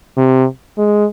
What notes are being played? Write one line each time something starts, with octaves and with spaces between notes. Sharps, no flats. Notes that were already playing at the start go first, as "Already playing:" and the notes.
C3
G#3